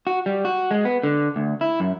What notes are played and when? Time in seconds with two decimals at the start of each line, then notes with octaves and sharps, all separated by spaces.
0.07 F#4
0.26 G3
0.45 F#4
0.71 G#3
0.85 B3
1.03 D3
1.36 D2
1.61 E4
1.80 F#2